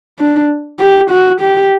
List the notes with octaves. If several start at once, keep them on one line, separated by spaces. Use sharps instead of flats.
D4
G4
F#4
G4